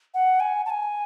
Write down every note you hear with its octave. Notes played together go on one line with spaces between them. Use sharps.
F#5
G#5
A5
G#5